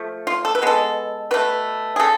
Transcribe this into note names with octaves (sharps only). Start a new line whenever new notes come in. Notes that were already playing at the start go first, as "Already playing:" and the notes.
Already playing: F3 A3
F4
A4
B4
B2 G#3 B3 A4
B2 A3 B4
G#4
C#3 A4